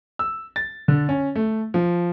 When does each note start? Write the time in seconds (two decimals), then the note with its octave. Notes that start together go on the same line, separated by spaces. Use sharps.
0.19 E6
0.56 A6
0.88 D3
1.09 C#4
1.36 A3
1.74 F3